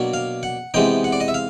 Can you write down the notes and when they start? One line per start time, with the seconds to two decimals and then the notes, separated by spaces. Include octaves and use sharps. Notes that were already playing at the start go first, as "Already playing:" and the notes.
Already playing: B2 F#3 A#3 D4
0.14 F5
0.43 F#5
0.74 C3 E3 G#3 B3 D#4 G5
1.04 F#5
1.12 D5
1.20 D#5
1.28 E5
1.34 F5